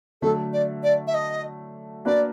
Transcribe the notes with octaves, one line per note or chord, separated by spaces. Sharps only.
D3 F#3 A3 A4
D5
D5
E5
D#5
A#3 D4 F#4 B4 D5